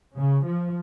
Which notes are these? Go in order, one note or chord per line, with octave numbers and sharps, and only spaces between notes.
C#3
F3